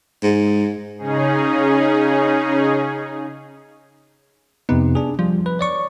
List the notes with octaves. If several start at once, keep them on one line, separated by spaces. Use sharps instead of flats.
G#2
C#3 C#4 D#4 G#4
F2 C3 B3 D#4
D4 G#4
F3 G3
B4
C#5 D5 C#6